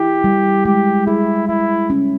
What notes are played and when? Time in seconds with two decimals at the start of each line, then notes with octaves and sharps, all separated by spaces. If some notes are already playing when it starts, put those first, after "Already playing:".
Already playing: E4 G4
0.24 G3
0.65 G#3 G4
1.07 E4 G#4
1.48 G#3 E4
1.90 C#4